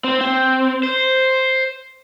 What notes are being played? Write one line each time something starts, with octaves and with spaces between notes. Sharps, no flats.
C4
C4
C5